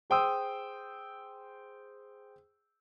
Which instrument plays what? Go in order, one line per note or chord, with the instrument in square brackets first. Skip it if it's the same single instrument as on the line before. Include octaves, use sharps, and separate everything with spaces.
[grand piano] G#4 C5 G5 C6 D#6 E6